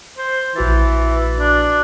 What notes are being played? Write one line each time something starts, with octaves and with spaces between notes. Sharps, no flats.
C5
A#1 E3 F#4 A6
D4